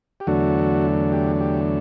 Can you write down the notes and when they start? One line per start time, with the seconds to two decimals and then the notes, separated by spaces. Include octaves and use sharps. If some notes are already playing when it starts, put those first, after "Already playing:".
0.20 G4
0.27 E2 D3 F#3 A3 D4 F#4
1.12 G4
1.40 G4